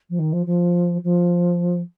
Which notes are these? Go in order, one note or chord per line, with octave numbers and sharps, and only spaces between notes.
F3
D#3
F3
F3
F3